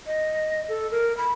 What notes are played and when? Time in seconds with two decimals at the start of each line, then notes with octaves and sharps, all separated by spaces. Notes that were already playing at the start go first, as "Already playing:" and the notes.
0.07 D#5
0.69 A4
0.91 A#4
1.17 B5